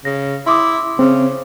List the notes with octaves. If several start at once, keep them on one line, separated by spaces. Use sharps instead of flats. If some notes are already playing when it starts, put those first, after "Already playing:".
C#3 A#6
E4 C6 D6 D#6
C#3 C4